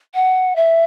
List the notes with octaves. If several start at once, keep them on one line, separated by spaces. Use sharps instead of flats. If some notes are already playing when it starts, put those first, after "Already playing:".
F#5
E5